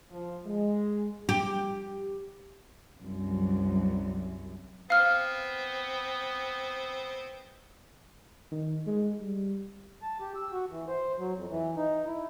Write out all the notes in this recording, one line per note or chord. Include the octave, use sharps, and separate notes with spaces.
F3
G#3
G4
C2 F#2
B3 C4 F5 F6
D#3
G#3
G3
A5
G4
E6
F#4
E3
C5
F#3
F2
E3
D#4
E4